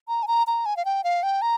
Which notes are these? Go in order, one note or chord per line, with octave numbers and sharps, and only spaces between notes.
A#5
G#5
A#5
A#5
G#5
F5
G5
F5
G5
A#5